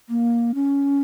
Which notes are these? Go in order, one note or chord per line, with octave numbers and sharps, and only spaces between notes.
A#3
C#4